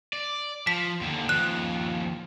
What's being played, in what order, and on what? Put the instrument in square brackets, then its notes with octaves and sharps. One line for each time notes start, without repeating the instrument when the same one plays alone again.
[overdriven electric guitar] D5
[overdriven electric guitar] F3 [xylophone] B6
[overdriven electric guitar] D#2 D3
[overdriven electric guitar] D#2 F3 [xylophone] F#6